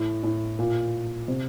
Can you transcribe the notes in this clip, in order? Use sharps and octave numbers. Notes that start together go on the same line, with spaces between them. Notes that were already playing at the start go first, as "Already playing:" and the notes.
Already playing: A2
A2
A#2
C3